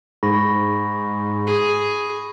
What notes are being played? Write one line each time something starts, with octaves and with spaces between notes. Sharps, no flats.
G#2 B5 C#6 A#6
G#4